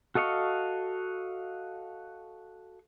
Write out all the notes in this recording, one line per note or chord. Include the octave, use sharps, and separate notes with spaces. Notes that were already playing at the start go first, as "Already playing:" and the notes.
F#4 A4 D#5 F5 C#6